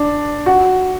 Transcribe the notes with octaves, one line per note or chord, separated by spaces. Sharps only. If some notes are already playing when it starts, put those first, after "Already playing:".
Already playing: D4
F#4